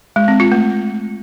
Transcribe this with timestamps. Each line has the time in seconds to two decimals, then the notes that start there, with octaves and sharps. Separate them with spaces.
0.16 G#3
0.28 C4
0.40 F4
0.52 A3